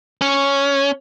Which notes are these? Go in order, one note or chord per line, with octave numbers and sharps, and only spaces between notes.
C#4